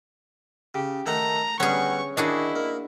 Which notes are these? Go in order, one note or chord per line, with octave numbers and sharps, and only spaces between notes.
C#3 G4
D#3 A3 A4 F#5 A#5
D3 G3 B3 C#4 G#4 F#5 C#6
D#3 D4 E4 F#4 G#4 D#5
A#3